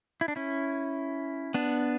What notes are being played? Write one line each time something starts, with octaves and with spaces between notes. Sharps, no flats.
E4
D4
C#4 E4
B3 D4